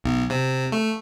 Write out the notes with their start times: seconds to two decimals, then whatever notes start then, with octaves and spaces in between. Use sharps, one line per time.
0.04 B1
0.30 C3
0.72 A3